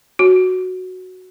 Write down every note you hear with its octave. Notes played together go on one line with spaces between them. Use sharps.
F#4